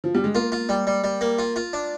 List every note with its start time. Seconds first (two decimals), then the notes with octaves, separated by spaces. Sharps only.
0.04 F3
0.14 G3
0.24 G#3
0.35 A#3 F4
0.52 F4
0.69 G3
0.87 G3
1.04 G3
1.21 A#3
1.39 F4
1.56 F4
1.73 D4